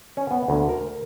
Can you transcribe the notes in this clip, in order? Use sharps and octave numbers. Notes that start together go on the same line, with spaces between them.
C#4
B3
D2
A#4